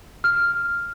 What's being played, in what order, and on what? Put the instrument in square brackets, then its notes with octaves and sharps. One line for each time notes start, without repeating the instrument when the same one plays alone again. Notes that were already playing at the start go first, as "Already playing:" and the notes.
[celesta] F6